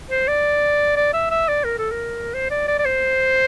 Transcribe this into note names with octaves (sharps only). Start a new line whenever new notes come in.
C5
D5
D5
E5
E5
D5
A#4
A4
A#4
C5
D5
D5
D5
C5